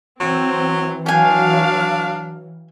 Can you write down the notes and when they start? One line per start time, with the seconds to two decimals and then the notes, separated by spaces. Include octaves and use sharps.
0.20 E3 F#3 C4
1.06 F#3 D4 F5 G5 G#5